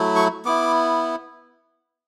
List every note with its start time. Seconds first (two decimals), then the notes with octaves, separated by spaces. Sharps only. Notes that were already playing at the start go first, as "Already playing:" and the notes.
Already playing: F#3 A3 E4
0.16 C#6
0.45 B3 E4 D6